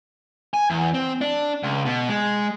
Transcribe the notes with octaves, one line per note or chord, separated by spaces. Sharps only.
G#5
E2
C4
D4
C#2
B2
G#3